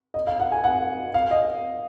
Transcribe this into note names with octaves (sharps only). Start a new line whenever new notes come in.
D#5
F5
F#5
G#5
F#5
F5
D#5